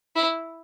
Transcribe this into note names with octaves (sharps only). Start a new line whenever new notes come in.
E4